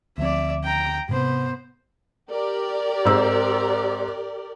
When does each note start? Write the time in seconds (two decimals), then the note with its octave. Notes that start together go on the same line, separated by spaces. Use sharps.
0.18 D2 F3 C4 D5 E5
0.64 G5 A#5
1.09 G#2 C3 B3 C5
2.29 G4 A#4 D5
3.05 G#2 C4 E6